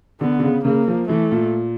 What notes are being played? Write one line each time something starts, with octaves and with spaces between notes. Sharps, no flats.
D3 B3
D3
C#3
C#3 A#3
F3
E3 A3
A#2